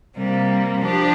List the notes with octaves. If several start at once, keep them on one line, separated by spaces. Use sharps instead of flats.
C3 G3 A#3
F3 D4 G4